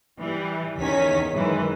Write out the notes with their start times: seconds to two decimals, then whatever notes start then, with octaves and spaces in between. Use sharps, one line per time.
0.19 E3 G3
0.78 E2 D#3 C#4 B6
1.33 F#2 D#3 E3 G#3